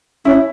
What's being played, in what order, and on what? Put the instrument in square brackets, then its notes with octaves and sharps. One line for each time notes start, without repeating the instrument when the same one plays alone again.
[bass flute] C#4 [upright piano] E4